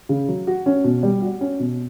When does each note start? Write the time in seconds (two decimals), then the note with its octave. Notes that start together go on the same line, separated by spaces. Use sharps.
0.09 C#3
0.28 F#3
0.47 F#4
0.66 C#4
0.84 B2
1.03 G3
1.22 F#4
1.41 C#4
1.60 B2